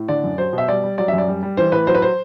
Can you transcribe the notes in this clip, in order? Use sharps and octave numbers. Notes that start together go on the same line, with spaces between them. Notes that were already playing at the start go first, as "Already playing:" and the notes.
Already playing: A2
D3 D5
F#2
F#3 C5
B2
E5
G3 D5
G3
F#3 D5
F#2 E5
D5
G3
G3
E3 C5
A2 B4
F#3 C5
B4
C5